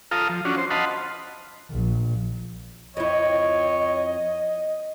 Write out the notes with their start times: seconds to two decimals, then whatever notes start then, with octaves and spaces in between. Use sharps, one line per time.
0.11 F4 A4 F5 A#5 D#6
0.29 F3
0.45 C#4 D4 F4 F#4
0.58 C5
0.71 D#5 F5 F#5 A5 B5 C6
1.71 A#1
2.97 F2 E4 C#5 D#5